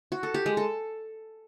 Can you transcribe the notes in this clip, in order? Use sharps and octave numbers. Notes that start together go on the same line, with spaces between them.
F#4
A4
G4
G#3
A4